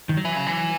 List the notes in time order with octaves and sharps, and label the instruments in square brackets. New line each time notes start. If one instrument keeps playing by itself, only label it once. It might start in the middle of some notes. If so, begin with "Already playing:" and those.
[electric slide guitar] D#3
F#3
[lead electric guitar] E3
C#3
E3